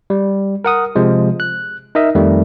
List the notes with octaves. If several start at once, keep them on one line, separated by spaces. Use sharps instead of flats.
G3
A#4 F#5 D#6
C3 F3 G#3
F#6
D#4 A#4 D#5 E5
F2 D#3 G3 A3